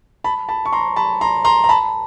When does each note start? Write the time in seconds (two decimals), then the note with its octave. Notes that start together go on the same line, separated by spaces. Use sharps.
0.24 A5 B5
0.48 A5 B5
0.65 C#6
0.73 A#5 C6
0.96 A5 B5
1.21 A#5 C6
1.45 A#5 C6
1.64 A#5
1.69 A5 B5